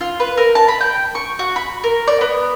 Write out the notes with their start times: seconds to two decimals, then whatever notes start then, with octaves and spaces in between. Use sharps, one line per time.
0.01 F4
0.20 B4
0.37 A#4
0.55 A5
0.68 B5
0.81 G5
1.15 C#6
1.39 F#4
1.56 B5
1.84 A#4
2.08 D5
2.21 B3